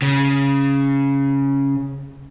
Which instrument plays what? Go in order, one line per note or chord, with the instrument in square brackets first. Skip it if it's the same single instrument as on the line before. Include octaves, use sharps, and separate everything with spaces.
[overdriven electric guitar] C#3